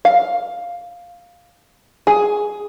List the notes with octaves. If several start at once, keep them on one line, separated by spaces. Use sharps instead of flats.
F5
G#4